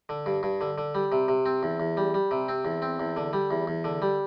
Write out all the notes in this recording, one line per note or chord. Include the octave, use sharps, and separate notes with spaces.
D3
G2
G2
D3
D3
G3
C3
C3
C4
E2
E2
G3
G3
C3
C4
E2
C4
E2
D3
G3
E2
E2
D3
G3